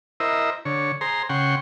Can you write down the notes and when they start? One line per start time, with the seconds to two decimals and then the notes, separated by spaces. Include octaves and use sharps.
0.20 E4 A#4 C5 D#5 E5
0.65 D3 C#5
1.01 G#4 C5 A#5 C6
1.29 C#3 F#5 G5 C6 C#6